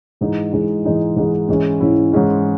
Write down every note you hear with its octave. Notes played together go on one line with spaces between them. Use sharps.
G#2 E3 G#3 D#4
G#2 E3 G#3 D#4
G#2 E3 G#3 D#4
G#2 E3 G#3 D#4
G#2 E3 G#3 C#4 E4
G#2 E3 G#3 C#4 E4
G#2 E3 G#3 C#4 E4